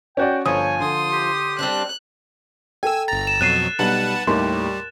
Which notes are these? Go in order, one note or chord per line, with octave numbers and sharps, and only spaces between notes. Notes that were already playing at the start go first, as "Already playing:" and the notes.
C#4 F#4 D5 G5
G1 F3 C#5 G#5 D#6
D3 C6 D#6
G4
G3 C4 D4 F#6
A4 G5 G#5 E6
G1 A#5 A6
E7
F2 B2 F#3 F#6 C7 D#7 E7
B1 G3 B4 F#5 A5 F#7
D#2 A2 G3 G4 C6